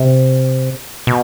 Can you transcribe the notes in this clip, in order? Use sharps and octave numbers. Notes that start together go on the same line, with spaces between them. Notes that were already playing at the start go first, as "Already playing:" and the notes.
Already playing: C3
B2